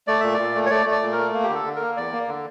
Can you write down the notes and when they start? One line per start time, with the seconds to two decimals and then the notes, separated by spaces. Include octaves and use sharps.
0.07 A3 D5
0.21 A#2 E5
0.34 D5
0.39 A#2
0.55 A3
0.66 C#5
0.70 A3 D5
0.86 A3
0.92 D5
1.02 A#2
1.13 A#4
1.18 A3
1.33 A#3
1.44 G4
1.49 D3
1.54 A4
1.65 D3
1.76 A#3 A#4
1.96 E2 D5
2.12 A#3
2.28 D3